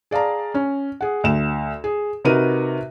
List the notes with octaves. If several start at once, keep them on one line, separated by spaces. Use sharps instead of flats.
G#4 D5 F5 A5 A#5
C#4
G#4 F#5
D2 E7
G#4
C3 D#4 F#4 A#4 B4 D#7